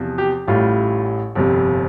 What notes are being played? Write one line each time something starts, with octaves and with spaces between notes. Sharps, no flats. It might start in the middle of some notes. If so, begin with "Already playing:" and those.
Already playing: E2 C3 F3
G4
A1 A2 G3 F4
G1 F2 C3 G3